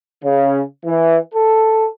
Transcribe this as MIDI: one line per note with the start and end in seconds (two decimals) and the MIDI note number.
0.24 0.61 49
0.85 1.18 52
1.35 1.87 69